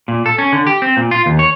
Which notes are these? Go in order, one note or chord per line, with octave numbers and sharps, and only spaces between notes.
A#2
A4
C#4
D3
G4
C4
A#2
F4
D#2
C#5